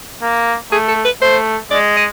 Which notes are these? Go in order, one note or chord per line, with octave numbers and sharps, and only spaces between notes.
A#3
A3 G#4
A4
B4
A3 C5
G#3 D5
D#5